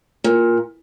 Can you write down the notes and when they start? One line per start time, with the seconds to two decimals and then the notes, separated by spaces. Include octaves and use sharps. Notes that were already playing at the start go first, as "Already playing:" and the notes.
0.24 A#2